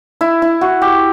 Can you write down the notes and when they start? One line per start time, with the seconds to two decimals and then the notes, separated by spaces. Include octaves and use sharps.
0.21 E4
0.42 E4
0.61 F#4
0.82 G4